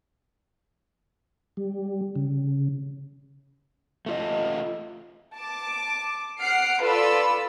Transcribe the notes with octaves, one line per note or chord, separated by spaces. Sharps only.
G3
C#3
A3 F4 D#5
A5 D6
F#5 F6 C7 D7
F4 A4 B4 D5 B5 E6